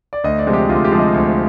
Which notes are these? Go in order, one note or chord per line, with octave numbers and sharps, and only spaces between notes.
D5
D2 D#5
D5
C3 F3 G#3
G4
D2 F4
G4
C3 F3 G#3
D#5
D2